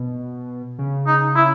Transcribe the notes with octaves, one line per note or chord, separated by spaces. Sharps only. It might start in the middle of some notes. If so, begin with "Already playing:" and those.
Already playing: B2
C#3
D#4
E4